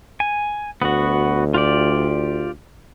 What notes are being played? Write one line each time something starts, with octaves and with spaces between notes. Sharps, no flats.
G#5
D2 B3 F#4
F4 G4 D5